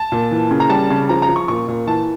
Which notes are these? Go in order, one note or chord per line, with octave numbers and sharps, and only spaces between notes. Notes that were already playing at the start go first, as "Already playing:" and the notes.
Already playing: A5
A#2
E3
C#3
A#5
G3 A5
C#3
F3 A#5
A#5
F3
C#6
A#2 C#6
A#2
E3 A5